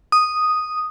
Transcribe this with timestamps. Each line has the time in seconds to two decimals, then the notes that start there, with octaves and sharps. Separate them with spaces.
0.12 D#6